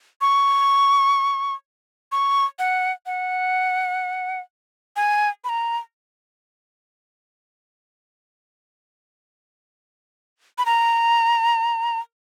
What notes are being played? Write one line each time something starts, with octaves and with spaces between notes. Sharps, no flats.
C#6
C#6
F#5
F#5
G#5
B5
A#5
B5
A#5